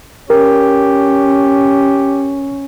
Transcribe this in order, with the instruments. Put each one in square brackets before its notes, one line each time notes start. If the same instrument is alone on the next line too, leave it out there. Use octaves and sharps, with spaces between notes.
[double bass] C#4 [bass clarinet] G4 [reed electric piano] A#4